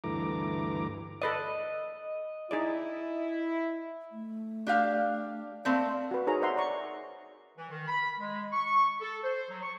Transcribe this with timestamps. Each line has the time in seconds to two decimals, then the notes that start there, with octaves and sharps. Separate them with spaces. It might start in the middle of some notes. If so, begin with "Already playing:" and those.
0.04 D2 G2 E3 A3 A#5 D6
1.22 A4 B4 D5 D#5
2.51 D#4 E4 G#4 D5
4.12 A3
4.67 D4 G4 F5
5.65 A3 A#3 C4 D5
6.11 F#4 B4
6.27 D#4 F#4 G#4 A#4 C#5 A#5
6.42 C5 D5 E5 F#5 A#5 C6
6.57 D5 A#5 C#6
7.57 E3
7.69 D#3
7.87 B5
8.19 G#3
8.53 C#6
9.01 A4
9.24 C5
9.49 F#3
9.63 C#6